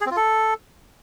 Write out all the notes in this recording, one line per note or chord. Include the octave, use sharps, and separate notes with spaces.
G#4
C4
F4
A4